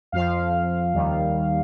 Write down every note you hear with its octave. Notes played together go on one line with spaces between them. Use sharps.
F2 F3 F5
D#2 D#3 G3